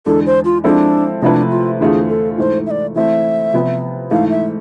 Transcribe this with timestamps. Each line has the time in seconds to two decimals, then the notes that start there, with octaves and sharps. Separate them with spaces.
0.06 E2 D3 G#3 D4 A4
0.26 C5
0.45 F4
0.64 F3 G#3 C4 D4 E4 A4
1.22 C3 F3 A3 D4 E4 B4
1.51 F4
1.80 E2 D3 A3 C4 F4 G#4
2.09 A4
2.38 G#2 E3 A3 C5
2.66 E5
2.71 D5
2.95 E3 A3 C4 E5
3.54 C3 F3 B3
4.11 G#2 E3 A3 F5
4.30 E5